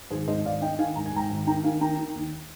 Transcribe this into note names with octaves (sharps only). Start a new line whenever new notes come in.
G#1 G#4 C5
G#2 C5 D#5
G#1 D5 F5
D#3 D#5 G5
D#3 F5 G#5
G#2 A#5
G#5
G#2 G5 A#5
G#1
D#3 G5 A#5
D#3 F5 G#5
D#3 G5 A#5
D#3
D#2